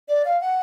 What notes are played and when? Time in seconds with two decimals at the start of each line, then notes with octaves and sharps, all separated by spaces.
0.08 D5
0.25 F5
0.41 F#5